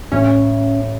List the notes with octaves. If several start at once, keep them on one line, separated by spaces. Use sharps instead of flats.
A1 C#4